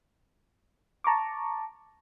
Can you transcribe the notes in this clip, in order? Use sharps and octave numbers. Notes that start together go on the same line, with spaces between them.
A5 A#5 C#6 D6